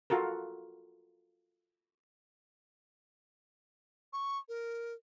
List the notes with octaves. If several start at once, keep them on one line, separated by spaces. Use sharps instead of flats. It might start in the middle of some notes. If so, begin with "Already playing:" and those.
F4 F#4 A4 A#4
C#6
A#4